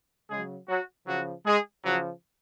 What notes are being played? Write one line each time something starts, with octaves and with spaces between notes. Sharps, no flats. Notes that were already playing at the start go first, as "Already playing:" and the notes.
C#3 F#3 G#3 G#4
F#3 F#4
C#3 F3 F#3 F#4
G#3 G#4
C#3 F3 F#3 F#4